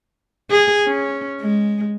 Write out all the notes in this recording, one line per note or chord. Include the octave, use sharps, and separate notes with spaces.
G#4
C#4
G#3